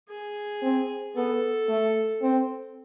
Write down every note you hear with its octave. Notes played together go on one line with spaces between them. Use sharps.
G#4
C4
B3 A4
A3
C4